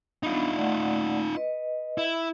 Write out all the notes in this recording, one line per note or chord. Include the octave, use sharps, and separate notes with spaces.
B3 D4 D#4 F4 B5
A3 D5 F#5
B4 D#5
E4